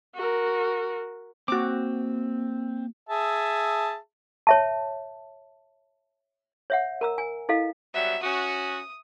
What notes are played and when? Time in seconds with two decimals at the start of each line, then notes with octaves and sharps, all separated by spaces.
0.15 F#4 A#4
1.48 A#3 C4 F#4 D6
3.09 G#4 E5 A5
4.47 C#5 E5 A5
6.70 C#5 E5 F#5
7.01 A#4 A#5 E6
7.18 G#5
7.49 E4 A4 D#5 F5
7.94 F#3 G3 B3 E5
8.23 C#4 F#4 D#6